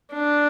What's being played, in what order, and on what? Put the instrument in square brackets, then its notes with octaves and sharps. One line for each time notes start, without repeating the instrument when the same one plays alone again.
[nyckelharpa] D4